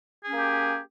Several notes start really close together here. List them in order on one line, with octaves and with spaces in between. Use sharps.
G#4 C#4 A#3 G4